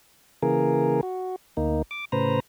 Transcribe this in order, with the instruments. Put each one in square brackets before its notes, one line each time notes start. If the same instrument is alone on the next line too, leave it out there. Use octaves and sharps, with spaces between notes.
[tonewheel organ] C#3 E3 A#3 G#4 A#4
F#4
D2 A#3 D#4
D6
A2 C#3 B4 C5 A#5